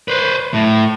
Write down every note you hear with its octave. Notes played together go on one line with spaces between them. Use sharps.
B4 C5
A2